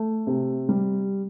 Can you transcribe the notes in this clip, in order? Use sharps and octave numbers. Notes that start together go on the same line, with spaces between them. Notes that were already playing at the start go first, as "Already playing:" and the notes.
Already playing: A3
C3
G3